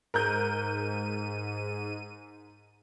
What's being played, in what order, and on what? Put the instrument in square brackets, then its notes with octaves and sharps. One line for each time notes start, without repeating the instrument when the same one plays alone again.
[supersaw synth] G#2 D#7 [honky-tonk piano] A#4 F#6 G6